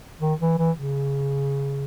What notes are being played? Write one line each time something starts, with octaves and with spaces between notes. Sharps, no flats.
D#3
E3
E3
C#3